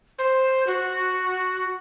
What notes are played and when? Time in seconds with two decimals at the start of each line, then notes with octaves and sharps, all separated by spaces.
0.19 C5
0.67 F#4